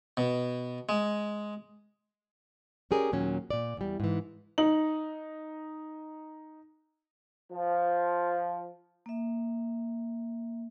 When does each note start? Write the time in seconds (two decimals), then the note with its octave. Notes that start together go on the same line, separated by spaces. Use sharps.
0.17 B2
0.89 G#3
2.91 C#4 G4 G#4 A#4 D5
3.12 D#2 A#2 F#3 C#4
3.50 A#2 D5
3.77 E2 G3
4.00 G#2 E3
4.58 D#4 F#7
7.52 F3
9.06 A#3 E5